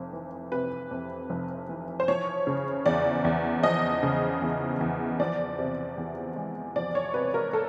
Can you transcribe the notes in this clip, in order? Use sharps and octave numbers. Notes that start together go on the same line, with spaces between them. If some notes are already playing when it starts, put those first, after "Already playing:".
Already playing: F1 F2
E3
C3 B4
F2
F1
E3
C5
F3 C#5
C#3
E2 D5
E2
F3 D#5
C#3
E2
E2
F3 D5
C3
E2
G#3
F3 D5
C#5
C3 B4
A#4
A4